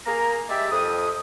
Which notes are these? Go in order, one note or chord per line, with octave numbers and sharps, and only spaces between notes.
A#3 G#4 A#5
G#3 G4 D5 E5
F2 D#6